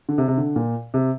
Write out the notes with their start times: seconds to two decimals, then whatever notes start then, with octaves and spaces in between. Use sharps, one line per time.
0.09 D3
0.18 C3
0.28 C3
0.38 D3
0.56 A#2
0.94 C3